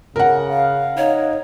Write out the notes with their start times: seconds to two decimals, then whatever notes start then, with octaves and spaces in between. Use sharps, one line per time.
0.16 C#3 A#4 F#5
0.50 F5
0.97 D#4 C#5